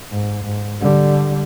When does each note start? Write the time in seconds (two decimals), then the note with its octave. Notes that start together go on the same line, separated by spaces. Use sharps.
0.11 G#2
0.44 G#2
0.80 D3 G3